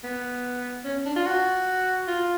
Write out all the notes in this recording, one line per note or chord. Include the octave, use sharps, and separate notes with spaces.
B3
C#4
D4
F4
F#4
F4